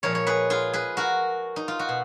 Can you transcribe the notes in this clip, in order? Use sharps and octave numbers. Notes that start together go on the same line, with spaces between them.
A#2 F3 G#3 A#4 C#5
C#5
G#4 B4
F4 G#4
G#4 B4
F#4 A#4
D#4
F4
F#4
B2